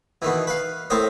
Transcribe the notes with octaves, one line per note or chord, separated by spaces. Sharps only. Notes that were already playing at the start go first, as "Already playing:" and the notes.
B2 D#3 E3
B4 F5
A2 C4 A#4 C5 D#6